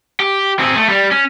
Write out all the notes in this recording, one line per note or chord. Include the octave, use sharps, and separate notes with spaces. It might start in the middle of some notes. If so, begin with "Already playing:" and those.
G4
C4 G#4
A3
G3
C#4